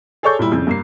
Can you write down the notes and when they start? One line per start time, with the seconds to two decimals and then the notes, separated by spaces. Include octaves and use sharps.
0.23 G#4 A4 C#5 D5 C#6 G6
0.39 A#2 G3 E4
0.52 F2 C#3
0.67 G2 A#3 C7